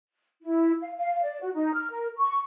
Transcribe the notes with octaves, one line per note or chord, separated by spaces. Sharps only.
E4
F5
F5
D5
F#4
D#4
F6
A#4
C#6